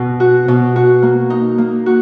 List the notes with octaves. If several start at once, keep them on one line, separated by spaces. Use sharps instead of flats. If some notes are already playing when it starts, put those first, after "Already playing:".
Already playing: B2
F#4
B2
F#4
A#3
D#4
A#3
F#4